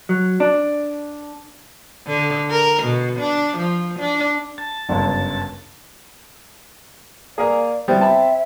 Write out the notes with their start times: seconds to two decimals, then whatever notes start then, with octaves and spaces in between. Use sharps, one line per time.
0.09 F#3
0.40 D4
2.07 D3
2.51 A#4
2.83 B2
3.20 D4
3.58 F3
4.00 D4
4.58 A5
4.89 G1 C#2 F#2
7.38 A#3 G#4 A#4 D5
7.88 G3 B3 C4 E4
8.01 E5 A5 B5